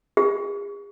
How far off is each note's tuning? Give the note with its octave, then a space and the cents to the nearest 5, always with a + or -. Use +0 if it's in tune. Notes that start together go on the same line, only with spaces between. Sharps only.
G#4 -40